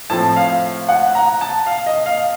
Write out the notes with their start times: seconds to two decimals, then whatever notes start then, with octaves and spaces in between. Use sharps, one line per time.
0.10 A2 F3 C4 A5
0.36 F5
0.89 F#5
1.15 A#5
1.41 A5
1.66 F5
1.86 D#5
2.06 F5